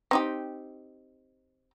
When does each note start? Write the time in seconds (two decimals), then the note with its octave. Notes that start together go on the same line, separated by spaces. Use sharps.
0.11 C4 D#4 G4